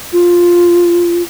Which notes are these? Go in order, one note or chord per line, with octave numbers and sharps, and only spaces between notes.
F4